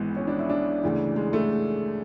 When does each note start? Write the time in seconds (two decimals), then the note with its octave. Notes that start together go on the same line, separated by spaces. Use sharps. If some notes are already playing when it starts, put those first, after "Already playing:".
Already playing: G#1 G#2 E3 B3
0.17 C#4
0.27 D4
0.39 E4
0.50 D4
0.83 D2 C#3 E3
1.16 G#3
1.33 A3